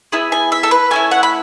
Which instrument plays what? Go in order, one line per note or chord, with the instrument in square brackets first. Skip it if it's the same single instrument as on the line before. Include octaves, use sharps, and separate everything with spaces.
[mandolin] B3 E4 G#4
G#5
E5
A4
B4
A3 C#4 E4 G#5
F#5
B5